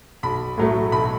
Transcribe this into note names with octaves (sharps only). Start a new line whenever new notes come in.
B1 B5
A2 F#3 A3
B1 B5